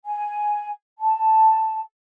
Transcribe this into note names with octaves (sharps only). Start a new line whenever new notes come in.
G#5
A5